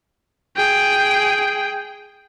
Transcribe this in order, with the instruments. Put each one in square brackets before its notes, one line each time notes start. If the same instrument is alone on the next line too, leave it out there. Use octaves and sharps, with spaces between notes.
[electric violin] G#4 G5